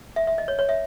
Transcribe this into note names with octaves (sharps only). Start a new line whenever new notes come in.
E5
E5
D#5
C#5
C#5
E5